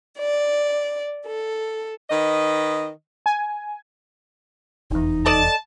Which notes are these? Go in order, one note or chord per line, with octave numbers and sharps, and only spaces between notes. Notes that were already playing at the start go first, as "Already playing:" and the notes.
D5
A4
D#3 B4 D#5
G#5
F1 E2 D#4
A4 D5 D#5 A5